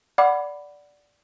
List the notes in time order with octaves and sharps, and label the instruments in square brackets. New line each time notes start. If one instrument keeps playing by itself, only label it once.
[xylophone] D5 F#5 B5 D6